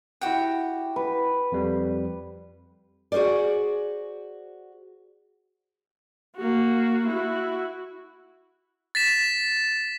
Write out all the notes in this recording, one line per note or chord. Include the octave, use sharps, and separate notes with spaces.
E4 F#4 G4 F#5 G5
B4
F2 G3
F#4 G#4 A#4 C5 D5
A#3 F#4
E4 F#4
A6 B6 E7